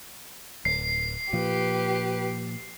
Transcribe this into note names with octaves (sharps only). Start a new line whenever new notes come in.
D1 C7
A#2 F3 G4 B4